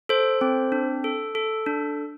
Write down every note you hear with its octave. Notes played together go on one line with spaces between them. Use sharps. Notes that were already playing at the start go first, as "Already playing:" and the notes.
A4 C5
C4
D4
A4
A4
D4